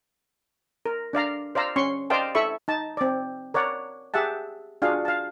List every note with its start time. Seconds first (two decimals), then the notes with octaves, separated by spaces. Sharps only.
0.86 A#4
1.13 D4 D5 F5 A#5
1.55 C5 D5 F5 A#5 E6
1.76 C#4 C6 C#6
2.10 C5 D5 D#5 F5 G5 A5
2.35 E4 A4 E5 B5 C#6
2.68 D#4 A5
2.97 C4 D5
3.54 A#4 C#5 D5 F#5
4.14 G4 G#4 E5 F#5 A5
4.82 D4 F4 F#4 G#4 F5
5.05 F5 A5